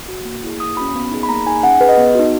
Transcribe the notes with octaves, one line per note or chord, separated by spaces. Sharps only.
F#4
A#3
E4 G#4
A#3 D#6
C#4 F#4 B5
B3
D#4 G#4
B5
A#3 A#5
D#4 G#4 G#5
C#4 F#5
G#4 B4
D#5
B3
D#4 F#4